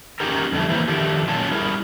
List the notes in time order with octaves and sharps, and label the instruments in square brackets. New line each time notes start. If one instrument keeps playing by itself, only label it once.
[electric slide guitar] C#4 D#4 F#4 G4 A#4
F2 D3 G3 A3 E4
E3 A#3 C4 E4 C5
D#3 F3 A3 D4 G4
A#2 F#3 C#4 F4 A5
G3 E4 G#4 A#4